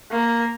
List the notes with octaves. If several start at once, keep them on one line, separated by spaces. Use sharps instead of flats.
A#3